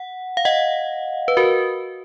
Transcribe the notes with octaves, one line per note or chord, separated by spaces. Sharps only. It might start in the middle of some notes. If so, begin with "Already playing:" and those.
Already playing: F#5
F5
D#5 F#5
B4
F#4 A#4